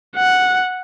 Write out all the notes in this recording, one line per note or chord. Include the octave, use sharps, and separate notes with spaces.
F#5